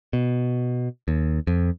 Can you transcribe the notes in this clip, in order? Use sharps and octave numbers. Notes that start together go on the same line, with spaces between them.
B2
D#2
F2